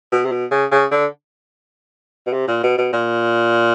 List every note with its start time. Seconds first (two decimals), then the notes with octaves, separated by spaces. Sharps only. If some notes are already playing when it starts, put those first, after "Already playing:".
0.12 B2
0.25 C3
0.31 B2
0.51 C#3
0.71 C#3
0.91 D3
2.26 B2
2.33 C3
2.47 A#2
2.63 B2
2.78 B2
2.93 A#2